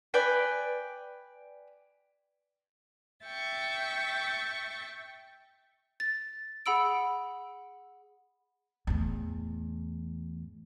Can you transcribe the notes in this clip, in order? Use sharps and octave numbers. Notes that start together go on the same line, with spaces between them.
B4 D5 G5 G#5
E5 G5 C#6 A6
A6
G#4 F#5 B5 E6 D7
E2 A2